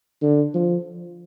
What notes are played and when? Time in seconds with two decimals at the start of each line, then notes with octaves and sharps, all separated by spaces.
0.22 D3
0.54 F3